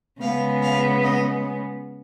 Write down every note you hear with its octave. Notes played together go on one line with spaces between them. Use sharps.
C#3 G#3 B3 F5
F5
D#5